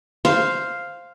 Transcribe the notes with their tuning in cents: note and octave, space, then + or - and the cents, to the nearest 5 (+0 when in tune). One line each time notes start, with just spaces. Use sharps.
C5 +0 F5 +0